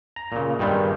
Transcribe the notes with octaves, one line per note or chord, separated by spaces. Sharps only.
A#5
A#2 C#3
G2 D#3 G3 G#3